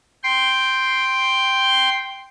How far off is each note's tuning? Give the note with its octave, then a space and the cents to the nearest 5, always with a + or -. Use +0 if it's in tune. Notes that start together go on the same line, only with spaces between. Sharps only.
G5 +0 C6 +0